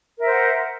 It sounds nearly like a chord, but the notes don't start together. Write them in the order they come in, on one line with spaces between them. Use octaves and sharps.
A#4 E5 C5 F#5